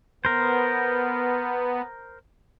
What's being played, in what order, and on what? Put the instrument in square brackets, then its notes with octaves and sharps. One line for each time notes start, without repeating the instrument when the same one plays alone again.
[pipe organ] B3 [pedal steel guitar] A#4 C5